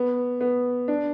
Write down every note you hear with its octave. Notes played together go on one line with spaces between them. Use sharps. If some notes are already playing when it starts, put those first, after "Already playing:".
Already playing: B3
B3
D4